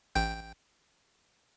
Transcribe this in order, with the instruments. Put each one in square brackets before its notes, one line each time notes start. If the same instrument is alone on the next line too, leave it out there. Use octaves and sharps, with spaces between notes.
[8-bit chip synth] A1 G5 G6